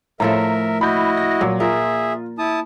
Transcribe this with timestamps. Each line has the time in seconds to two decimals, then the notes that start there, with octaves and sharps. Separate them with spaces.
0.20 A2 F3 A3 A#4 E5 A#5
0.81 E4 F#4 D#5 B5 G6
1.17 A#6
1.41 A#2 F#3
1.60 F4 G#4 A#4 E5
2.38 E4 A5 D#6